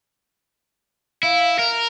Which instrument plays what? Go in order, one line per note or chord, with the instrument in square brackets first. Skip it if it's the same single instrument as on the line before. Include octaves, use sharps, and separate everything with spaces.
[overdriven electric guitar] E4 [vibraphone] F5
[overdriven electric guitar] A#4